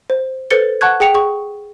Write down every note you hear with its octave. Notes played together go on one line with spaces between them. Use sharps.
C5
A4 B4 C5 A6 C#7 G7
F#5 A5 C#6 F#6 G#6
G#4 G5 C#7 F7
G#4 C#6